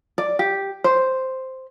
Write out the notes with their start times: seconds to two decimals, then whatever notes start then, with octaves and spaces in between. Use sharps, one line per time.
0.18 D5
0.39 G4
0.84 C5